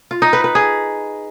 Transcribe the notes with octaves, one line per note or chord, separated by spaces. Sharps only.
F4
D#4
B4
B4
G#4